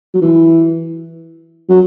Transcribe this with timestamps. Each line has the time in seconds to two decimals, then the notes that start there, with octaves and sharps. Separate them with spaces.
0.14 F#3
0.22 E3
1.69 F#3